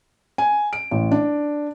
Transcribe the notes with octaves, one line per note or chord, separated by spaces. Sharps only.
G#5
D7
A1
D4